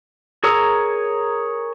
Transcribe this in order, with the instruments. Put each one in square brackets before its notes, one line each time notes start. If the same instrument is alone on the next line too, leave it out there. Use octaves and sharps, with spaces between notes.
[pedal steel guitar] G#4 A#4 C#5 A#5 E6